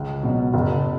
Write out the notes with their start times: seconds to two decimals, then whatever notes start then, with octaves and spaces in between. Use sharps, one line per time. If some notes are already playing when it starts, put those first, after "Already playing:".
Already playing: C#2
0.23 B2 F#3
0.54 F#1